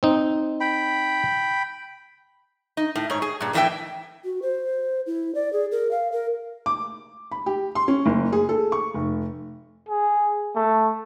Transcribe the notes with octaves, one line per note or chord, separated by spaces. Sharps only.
C4 D#4
G5 B5
D#4
A2
G#2 C#5
G#4
G2 A#2
F2 A2 E3 B3 E5 G5
F#4
C5
E4
D5
G#4
A#4
F5
A#4
D6
B5
G4
C6
C#4
F#1
G#4
A4
C#6
F1
G#4
A3